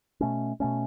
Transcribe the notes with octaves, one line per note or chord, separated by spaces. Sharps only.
B2 A3 C#4
B2 A3 C#4